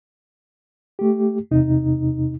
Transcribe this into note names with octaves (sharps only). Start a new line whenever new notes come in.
A3 G4
E2 C3 D#4